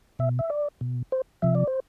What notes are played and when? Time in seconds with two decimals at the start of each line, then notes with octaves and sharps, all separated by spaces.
0.19 B2 E5
0.39 E5
0.50 D5
0.81 B2
1.12 C5
1.42 C3 F3 E5
1.55 D5
1.67 C5